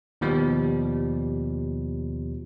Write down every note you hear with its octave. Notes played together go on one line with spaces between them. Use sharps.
D#2 B2 F3 G3